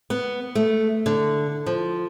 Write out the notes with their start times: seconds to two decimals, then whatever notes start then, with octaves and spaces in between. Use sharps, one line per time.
0.10 B3
0.55 A3
1.06 D3
1.66 F3